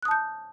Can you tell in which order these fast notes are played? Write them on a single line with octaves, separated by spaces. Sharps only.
F#6 D#6 A5 G6